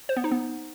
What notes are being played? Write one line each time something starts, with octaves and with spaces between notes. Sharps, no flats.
C5
B3
D#4
B3